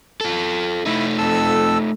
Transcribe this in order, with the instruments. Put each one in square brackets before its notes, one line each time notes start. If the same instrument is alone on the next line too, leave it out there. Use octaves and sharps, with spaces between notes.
[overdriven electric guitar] F4 A4
[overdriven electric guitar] A3 D#4 [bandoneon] E4 E5
[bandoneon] F2 A4 E6